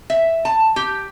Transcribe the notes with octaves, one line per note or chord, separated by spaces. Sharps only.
E5
A5
G4